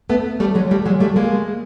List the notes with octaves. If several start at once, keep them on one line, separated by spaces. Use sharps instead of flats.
A3 B3
G3 A3
F#3 G#3
G3 A3
F#3 G#3
G3 A3
G#3 A#3